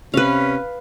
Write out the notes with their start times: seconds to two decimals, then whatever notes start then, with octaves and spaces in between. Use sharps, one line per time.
0.14 C3 C#4 B4 F5